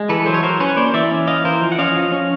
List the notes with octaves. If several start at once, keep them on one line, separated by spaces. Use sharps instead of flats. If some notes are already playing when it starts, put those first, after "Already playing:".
Already playing: G#3
E3 A4 B4
F#3 C5
C#5
F#3 A#4 C5
C#4 B4 C#5
A#3 C5 D5
E3 D5 E5
C#4
E3 D#5 F5
E3 A#4 C5
F3
F#5
C#4 D#5 F5
F3
C#4